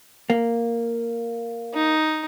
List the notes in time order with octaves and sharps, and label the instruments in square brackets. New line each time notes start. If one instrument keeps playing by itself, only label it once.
[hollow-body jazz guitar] A#3
[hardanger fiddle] D#4